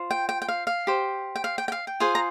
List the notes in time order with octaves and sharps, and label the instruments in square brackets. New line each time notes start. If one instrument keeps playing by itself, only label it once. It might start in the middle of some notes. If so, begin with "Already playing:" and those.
Already playing: [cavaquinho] F4 C5
G5
G5
G5
F5
F5
G4 C5
G5
F5
G5
G5
F5
G5
F4 G#4 C5 G#5
A#5